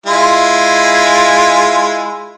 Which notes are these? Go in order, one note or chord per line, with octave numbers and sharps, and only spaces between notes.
G#3 E4 F4